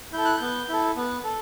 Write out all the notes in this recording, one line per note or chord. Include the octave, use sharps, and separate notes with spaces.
E4 A4 G6
F#6
B3 G6
E4 A4
B3
A4